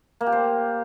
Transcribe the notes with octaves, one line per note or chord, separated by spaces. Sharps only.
A#3
G4
C5